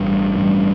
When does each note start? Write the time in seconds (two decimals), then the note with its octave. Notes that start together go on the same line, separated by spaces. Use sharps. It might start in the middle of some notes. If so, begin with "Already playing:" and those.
Already playing: A1 G2 G3
0.36 A1 G2 G3